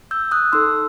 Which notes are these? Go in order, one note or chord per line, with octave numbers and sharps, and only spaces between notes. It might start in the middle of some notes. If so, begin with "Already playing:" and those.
E6 G6
D#6 F#6
D#4 A4 C6 E6